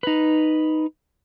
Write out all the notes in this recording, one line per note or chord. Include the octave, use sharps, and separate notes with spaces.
D#4 B4